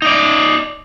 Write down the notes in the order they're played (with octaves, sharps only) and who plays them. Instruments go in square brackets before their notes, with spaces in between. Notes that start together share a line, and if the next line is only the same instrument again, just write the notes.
[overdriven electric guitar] D#4 D5